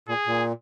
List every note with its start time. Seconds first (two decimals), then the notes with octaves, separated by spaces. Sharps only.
0.08 A#2 G#4
0.27 A#2